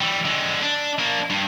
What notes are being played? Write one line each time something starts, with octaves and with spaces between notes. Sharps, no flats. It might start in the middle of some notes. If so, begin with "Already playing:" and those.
E3 G3
D3 G#3
D4
A#3 D4
G2